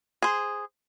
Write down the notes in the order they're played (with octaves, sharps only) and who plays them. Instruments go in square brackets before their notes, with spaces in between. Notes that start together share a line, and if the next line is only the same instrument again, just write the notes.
[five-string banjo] G#4 C5